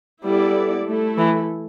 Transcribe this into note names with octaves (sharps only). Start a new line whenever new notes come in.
G3 B3 E4 A4 D5
A3 E4 A4
E3